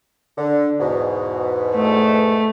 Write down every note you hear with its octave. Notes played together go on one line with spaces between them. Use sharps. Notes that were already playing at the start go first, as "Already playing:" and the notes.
D3
E2 G#2 B2
A3